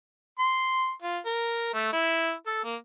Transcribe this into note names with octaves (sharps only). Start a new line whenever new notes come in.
C6
F4
A#4
A3
E4
A4
A#3